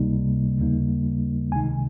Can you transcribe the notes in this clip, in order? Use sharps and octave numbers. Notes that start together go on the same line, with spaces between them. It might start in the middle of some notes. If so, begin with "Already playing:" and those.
Already playing: C#2 C3 G3 A#3 D#4
D#2 C#3 G3 A#3 D#4
C#2 C3 D#3 G#3 D#4 G#5